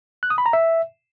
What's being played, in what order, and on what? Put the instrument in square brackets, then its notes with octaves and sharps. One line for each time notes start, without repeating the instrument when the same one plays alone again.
[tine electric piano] F#6
D#6
B5
A#5
E5